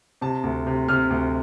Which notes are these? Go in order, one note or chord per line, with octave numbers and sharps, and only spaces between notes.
C3 A5
D2
C3
C3 F6
D2